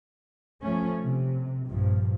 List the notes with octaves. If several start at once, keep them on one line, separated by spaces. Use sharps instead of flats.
F3 A3 C#4
C3
A#1 G2 A#2 F3